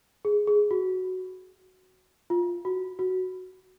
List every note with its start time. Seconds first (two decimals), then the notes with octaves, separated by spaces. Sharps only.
0.25 G#4
0.47 G#4
0.71 F#4
2.30 F4
2.65 F#4
2.99 F#4